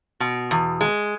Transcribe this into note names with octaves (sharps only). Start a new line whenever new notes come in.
B2
E2
G#3